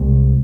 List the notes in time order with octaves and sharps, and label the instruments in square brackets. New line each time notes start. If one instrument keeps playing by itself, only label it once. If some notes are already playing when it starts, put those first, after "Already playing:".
Already playing: [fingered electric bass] C2 G#3